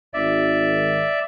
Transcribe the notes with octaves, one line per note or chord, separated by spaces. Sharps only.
G#1 D5 E5